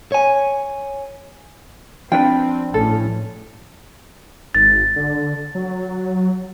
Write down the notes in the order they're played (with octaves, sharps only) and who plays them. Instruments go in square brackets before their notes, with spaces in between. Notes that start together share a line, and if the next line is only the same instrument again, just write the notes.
[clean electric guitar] C#5 G#5
[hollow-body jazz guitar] F3 D4 B4 [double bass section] C4 [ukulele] G5
[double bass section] A1 A2 C#4 [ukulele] A4
[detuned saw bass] G#1 [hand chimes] A6
[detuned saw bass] D3
F#3